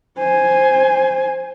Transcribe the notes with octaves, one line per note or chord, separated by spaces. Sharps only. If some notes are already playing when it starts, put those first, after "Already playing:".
C5 G#5